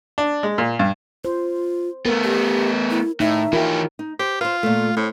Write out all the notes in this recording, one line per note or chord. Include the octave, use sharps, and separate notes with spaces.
D4
G#3
A#2
G2
F4 C5
A3 B3 A#4
G4
E4
A2 D#4 E5
E3 F4 G4 A#4
D#4
G4 C5
F4 B4 C5
A#2 A3
A2 C4